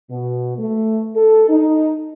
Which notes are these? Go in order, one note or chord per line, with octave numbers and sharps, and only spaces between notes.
B2
A3
A4
D#4